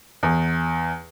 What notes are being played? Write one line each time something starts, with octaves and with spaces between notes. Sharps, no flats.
E2